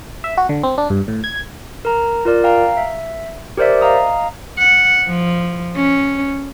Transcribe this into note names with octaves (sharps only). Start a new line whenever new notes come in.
E5
F#4
D3
C4
D4
G2
A2
G#6
A#4 A#5
F4 A#4 D5
F5 G5 A#5
E5
G4 A#4 C5 D5 E5
D#5 F5 A#5 D#6
F#5
F3
C#4